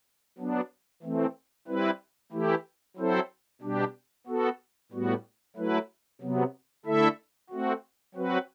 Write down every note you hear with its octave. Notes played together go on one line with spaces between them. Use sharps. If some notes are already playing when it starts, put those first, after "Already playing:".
F#3 B3 D4
E3 A3 C4
G3 C4 E4 B4
E3 A3 E4 G4
F#3 C4 E4 A4 C5
B2 G3 D4 G4
B3 F#4 A4
A2 G3 B3 F#4
F#3 A3 E4 B4
C3 F#3 B3
D3 A3 E4 A4 E5
A3 C4 F#4
F#3 C4 F#4 B4